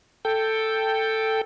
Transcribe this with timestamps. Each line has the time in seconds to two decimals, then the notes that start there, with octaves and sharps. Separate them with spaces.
0.25 A4 G5